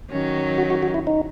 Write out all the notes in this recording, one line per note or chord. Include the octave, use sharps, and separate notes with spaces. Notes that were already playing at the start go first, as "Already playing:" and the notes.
D#3 F#3 C#4
F#4
F#4
F#4
E4
D#4